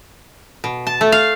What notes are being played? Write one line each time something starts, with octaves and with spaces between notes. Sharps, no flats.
B2
A5
A3
F5